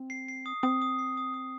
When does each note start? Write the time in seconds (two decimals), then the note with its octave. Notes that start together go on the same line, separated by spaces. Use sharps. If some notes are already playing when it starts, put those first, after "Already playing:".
Already playing: C4
0.10 C7
0.28 C7
0.46 D#6
0.63 C4 D#6
0.82 D#6
0.99 C7
1.17 D#6
1.34 D#6